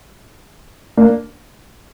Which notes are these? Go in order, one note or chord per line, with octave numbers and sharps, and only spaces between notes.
A#3 D4